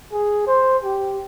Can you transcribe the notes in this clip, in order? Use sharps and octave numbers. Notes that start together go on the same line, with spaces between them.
G#4
C5
G4